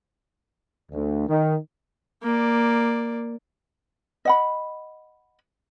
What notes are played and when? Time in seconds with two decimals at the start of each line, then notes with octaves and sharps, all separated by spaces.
0.91 D2
1.28 D#3
2.23 A#3 D5
4.25 D#5 F#5 B5